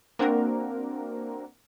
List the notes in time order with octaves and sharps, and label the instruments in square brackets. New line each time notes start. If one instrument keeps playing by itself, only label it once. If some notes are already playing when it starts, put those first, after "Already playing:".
[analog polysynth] A#3 C4 D4 F#4 A#4